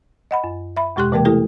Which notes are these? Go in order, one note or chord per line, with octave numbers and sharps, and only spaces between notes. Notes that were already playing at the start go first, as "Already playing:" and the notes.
D#5 F#5 B5
F#2
E5 B5
E2 B2 G#3 G4 C6 F#6
C3 E3 G#3 A#3 A#4 G5
A3 E4 G4 A4